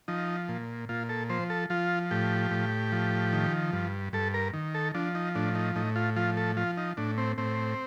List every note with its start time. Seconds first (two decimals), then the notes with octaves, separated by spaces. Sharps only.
0.08 F3 D#4
0.49 A#2
0.89 A#2 F4
1.09 A4
1.29 F3 C5
1.50 A4
1.70 F3 F4
2.11 A2 G4
2.51 A2
2.92 F3
3.33 D#3
3.73 G2
4.13 G2 A4
4.34 A#4
4.54 D#3
4.75 A4
4.94 F3 D4
5.15 D#4
5.35 A2 D4
5.55 D#4
5.76 A2 D#4
5.96 F4
6.16 F3 F4
6.37 A4
6.57 F3 F4
6.77 D#4
6.97 A2 D4
7.18 C4
7.38 A2 C4